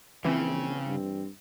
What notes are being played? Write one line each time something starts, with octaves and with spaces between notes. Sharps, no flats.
A#1 C#3 E3 C4
G2